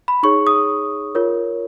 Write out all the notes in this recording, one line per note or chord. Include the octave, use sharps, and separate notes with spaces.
B5
D#4 G#4 C#5 C#6
D#6
F4 A#4 C#5